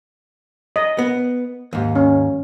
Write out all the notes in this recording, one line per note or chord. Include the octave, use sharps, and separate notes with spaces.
D#5
B3
D#2 G#2
C#4